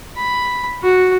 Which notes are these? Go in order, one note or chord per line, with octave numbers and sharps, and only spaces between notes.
B5
F#4